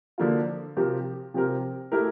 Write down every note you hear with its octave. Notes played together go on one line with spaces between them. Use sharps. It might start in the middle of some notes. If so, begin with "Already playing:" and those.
D3 F3 A#3 F4
C3 F3 C4 G4 A#4
C3 F3 C4 G4 A#4
A3 E4 G4 A#4